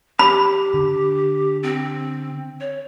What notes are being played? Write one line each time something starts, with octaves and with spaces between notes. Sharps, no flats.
G4 B5
D3
C4
C#5